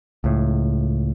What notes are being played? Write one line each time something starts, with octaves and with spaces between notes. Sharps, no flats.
C#2 A2